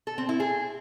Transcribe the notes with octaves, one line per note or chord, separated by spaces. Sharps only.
A4
C4
E4
G#4